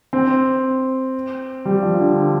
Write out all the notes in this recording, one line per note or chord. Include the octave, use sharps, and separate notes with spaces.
C4
G3
F3
D3